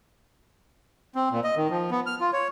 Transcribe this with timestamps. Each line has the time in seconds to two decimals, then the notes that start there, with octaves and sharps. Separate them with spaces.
1.15 C4
1.31 A#2
1.44 D#5
1.57 D#3
1.70 F3
1.91 B3
2.06 F6
2.20 F4
2.33 C#5